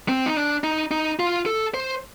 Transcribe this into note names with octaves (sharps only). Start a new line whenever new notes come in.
C4
D#4
D4
D#4
D#4
F4
A4
C5